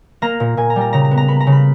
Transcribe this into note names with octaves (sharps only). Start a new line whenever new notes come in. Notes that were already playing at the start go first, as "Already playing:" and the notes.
A#3 A#5
A#2
A#2 G#5
A#5
G3
A#5
C#3 A#5
A#5
B3
A#5
B3 B5
A#5
C#3
B5